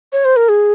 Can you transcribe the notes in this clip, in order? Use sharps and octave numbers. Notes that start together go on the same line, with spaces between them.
C#5
C5
A#4
G#4